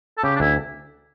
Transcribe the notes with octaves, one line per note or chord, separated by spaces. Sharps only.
A4
C#3 G4
D4
D2 E4